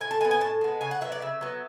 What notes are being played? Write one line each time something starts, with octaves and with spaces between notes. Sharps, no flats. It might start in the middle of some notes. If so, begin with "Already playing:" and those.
A2 G#5
A5
G#3 G#5
B3
G#5
A2 A5
G#3 B3
C#3 G#5
F#5
F#3 B3 E5
D5
C#3 E5
F#3 B3